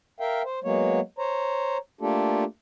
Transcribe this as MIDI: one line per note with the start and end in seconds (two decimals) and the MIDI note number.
0.20 0.42 70
0.20 0.42 76
0.20 0.42 77
0.20 0.42 79
0.45 0.59 72
0.64 1.00 54
0.64 1.00 56
0.64 1.00 58
0.64 1.00 59
0.64 1.00 73
1.18 1.77 72
1.18 1.77 73
1.18 1.77 82
2.01 2.44 57
2.01 2.44 58
2.01 2.44 62
2.01 2.44 65
2.01 2.44 67
2.01 2.44 69